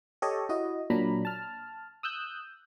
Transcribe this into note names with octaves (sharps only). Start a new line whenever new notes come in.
G4 A4 C#5 D#5
E4 F#4 D#5
A#2 F#3 D4 A#5 B5
A5 F6
D#6 E6 F#6 G6